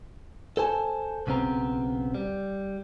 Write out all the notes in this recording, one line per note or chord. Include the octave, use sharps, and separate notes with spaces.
A4 C5 G#5 A5
B1 C#3 B3 C4 A#5
G3